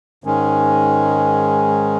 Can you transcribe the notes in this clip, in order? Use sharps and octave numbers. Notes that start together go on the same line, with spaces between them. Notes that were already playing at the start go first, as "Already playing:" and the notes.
G#2 D#3 G#3 C#4